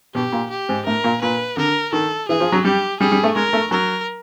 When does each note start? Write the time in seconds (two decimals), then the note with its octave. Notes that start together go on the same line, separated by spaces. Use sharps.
0.15 B2 G4
0.32 A#2
0.50 G4
0.69 G#2
0.86 A2 A#4
1.04 A#2
1.22 A#2 B4
1.57 D3 A#4
1.93 D#3 A4
2.29 E3 G#4
2.40 F3
2.52 F#3
2.64 G3 G4
3.00 G3 G#4
3.12 G3
3.24 A3
3.36 G#3 A#4
3.53 A3
3.71 F#3 A#4